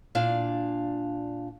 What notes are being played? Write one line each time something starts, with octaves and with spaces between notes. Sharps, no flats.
A#2 D4 F5